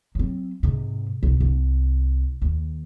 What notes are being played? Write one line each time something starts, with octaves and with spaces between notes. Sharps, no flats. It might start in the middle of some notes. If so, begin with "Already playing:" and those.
F#3 C4
G#2 C3
C2
C2
D#2